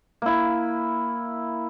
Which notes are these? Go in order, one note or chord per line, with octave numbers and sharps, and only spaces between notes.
A#3 E4